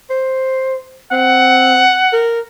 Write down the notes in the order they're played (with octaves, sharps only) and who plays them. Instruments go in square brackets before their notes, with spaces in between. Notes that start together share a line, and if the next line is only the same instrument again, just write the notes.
[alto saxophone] C5
[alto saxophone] C4 [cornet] F#5
[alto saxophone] A#4